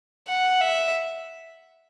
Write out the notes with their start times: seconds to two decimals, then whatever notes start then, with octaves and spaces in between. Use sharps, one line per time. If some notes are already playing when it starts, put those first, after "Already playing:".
0.27 F#5
0.61 E5